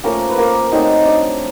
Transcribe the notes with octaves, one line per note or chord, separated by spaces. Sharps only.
F3 A3 A#3 C#4 A#4
B4
A#3 A#4
F#3 A3 C4 D#4 D#5
D4 D5